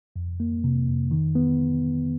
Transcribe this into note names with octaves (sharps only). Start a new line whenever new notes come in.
F2
A#3
C3
F2
D#3
B3